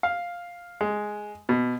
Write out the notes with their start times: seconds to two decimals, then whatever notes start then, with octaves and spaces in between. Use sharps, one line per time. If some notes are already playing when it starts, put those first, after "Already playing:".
0.03 F5
0.81 G#3
1.49 B2